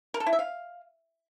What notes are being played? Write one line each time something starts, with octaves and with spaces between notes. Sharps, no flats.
A#4
A4
E4
E5
F5